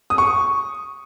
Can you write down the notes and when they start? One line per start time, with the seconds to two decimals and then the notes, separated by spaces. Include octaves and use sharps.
0.10 D#6
0.18 C#6